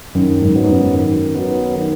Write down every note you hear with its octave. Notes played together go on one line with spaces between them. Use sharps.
F#2 D#3
G#2
F#3 B3
G#2
F#2
D#3
F#3 B3
D#3